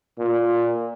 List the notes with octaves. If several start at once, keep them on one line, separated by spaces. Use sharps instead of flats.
A#2